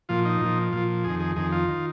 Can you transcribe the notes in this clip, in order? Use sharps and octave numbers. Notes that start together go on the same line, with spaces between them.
A#2 F3 F4
D#4
A#2 F3
A#2 F3 F4
F2 D#3 G#4
G#4
F2 D#3 G#4
F4
D#3